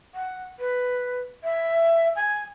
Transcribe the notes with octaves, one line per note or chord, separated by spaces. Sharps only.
F#5
B4
E5
G#5